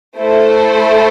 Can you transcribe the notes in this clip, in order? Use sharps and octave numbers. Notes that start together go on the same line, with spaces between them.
A3 E4 A4 C5